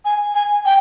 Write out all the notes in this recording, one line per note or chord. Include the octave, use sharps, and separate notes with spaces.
G#5
G#5
G5